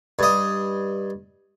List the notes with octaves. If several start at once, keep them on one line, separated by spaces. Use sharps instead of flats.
G2 D#5